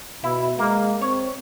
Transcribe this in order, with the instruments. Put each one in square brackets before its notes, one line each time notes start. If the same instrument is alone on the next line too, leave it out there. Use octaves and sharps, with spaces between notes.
[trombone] B2 [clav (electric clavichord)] E4
[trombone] G#3 [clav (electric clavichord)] A#3
[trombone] C4 [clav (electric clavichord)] C#5